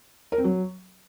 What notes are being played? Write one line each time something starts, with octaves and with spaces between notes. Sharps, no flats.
A#4
C4
F#3